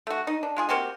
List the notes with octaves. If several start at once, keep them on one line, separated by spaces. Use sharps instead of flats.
A3 F#4
D#4
D4
G#3 F4 G#4
A#3 C4 F#4 G4